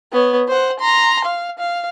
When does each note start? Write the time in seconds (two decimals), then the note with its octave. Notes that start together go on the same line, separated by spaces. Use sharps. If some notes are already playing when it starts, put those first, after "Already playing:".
0.12 B3 C#5
0.48 C5 F#5
0.80 A#5 C6
1.25 F5
1.59 F5